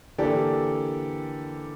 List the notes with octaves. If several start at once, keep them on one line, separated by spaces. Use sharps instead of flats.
D3 E3 A#3 G4 A4 D5